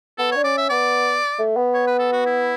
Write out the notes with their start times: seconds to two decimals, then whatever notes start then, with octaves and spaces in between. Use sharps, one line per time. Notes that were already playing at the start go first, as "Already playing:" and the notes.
0.18 B3 A4
0.31 C#5
0.36 D4
0.44 C#4 D5
0.57 E5
0.69 B3 D5
1.39 A3
1.57 B3
1.74 C#5
1.87 B4
1.99 A4
2.12 F#4
2.26 E4